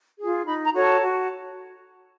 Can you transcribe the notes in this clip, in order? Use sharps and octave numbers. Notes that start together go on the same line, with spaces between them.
G#4
F4
D#4 B5
A#5
F#4 A4 C#5
A5
F#4